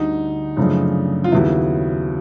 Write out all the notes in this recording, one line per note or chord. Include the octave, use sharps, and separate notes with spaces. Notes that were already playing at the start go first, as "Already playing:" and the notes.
Already playing: D2 D3 G3 D#4
F#2 C#3 F3 A3 D4
F4
D#2 C#3 F#3 B3 E4